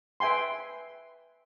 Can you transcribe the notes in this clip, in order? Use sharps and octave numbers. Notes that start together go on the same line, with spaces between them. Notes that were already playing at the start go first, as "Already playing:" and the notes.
B4 E5 G5 G#5 C6